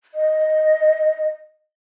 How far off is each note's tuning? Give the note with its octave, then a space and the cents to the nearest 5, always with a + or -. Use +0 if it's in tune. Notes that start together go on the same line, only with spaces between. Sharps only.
D#5 +0